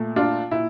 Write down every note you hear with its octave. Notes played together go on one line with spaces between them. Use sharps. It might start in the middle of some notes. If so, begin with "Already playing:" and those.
Already playing: A#2 A3
D4 F4
A#2 E4